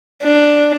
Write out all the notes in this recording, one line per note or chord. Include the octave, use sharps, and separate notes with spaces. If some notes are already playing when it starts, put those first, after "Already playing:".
D4